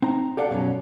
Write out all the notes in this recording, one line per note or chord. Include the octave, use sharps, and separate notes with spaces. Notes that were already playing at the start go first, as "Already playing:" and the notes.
C4 D#4 A#5
G4 A4 D5 F5 F#5
F#2 B2 F3 F#3 C#4